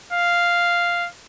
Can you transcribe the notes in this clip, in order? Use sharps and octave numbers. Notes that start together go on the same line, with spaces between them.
F5